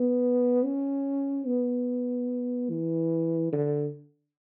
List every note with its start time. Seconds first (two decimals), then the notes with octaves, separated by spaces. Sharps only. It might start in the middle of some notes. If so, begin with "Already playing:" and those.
Already playing: B3
0.64 C#4
1.46 B3
2.70 E3
3.52 D3